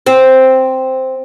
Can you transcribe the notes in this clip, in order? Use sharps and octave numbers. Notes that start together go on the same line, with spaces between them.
C4